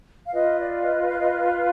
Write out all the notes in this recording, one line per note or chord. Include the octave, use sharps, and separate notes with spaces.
F5
F4 B4 D#5
D5
D#5
F5
D#5
F5